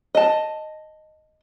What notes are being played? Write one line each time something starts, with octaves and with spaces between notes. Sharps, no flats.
D#5 A5